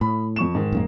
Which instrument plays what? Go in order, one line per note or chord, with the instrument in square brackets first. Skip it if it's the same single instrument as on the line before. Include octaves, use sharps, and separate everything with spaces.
[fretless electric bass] A2 [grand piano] B5
[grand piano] F2 C#6 E7
G#2 D#3
[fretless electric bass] D#1 F#2 A#3